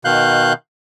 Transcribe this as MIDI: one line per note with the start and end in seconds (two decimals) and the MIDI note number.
0.05 0.53 47
0.05 0.53 51
0.05 0.53 77
0.05 0.53 90
0.05 0.53 91